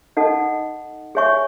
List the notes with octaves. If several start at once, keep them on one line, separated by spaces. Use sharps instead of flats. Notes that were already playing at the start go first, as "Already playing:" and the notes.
D#4 A4 D#5 F#5
G#4 C#5 E5 G#5 C#6